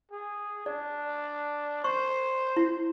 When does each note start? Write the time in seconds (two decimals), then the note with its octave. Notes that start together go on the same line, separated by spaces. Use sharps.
0.12 G#4
0.66 D4 D5
1.84 C5 C#6
2.57 E4